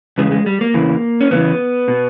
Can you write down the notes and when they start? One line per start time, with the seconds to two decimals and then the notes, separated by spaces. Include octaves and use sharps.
0.18 E2 C#3 G#3
0.32 G#3
0.46 G3
0.61 A#3
0.74 E2 C#3 E3
1.21 C#4
1.31 E2 C#3 E3 B3
1.88 B2